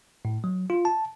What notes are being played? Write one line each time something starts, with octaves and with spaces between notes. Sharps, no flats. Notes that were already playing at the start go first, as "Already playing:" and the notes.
A2
F#3
F4
A5